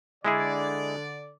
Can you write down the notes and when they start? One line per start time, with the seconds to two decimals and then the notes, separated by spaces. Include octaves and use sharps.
0.25 D3 G#3 E4 G#4 D5